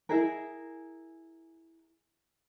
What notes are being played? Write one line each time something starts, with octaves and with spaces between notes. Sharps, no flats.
E4 G#4 A#4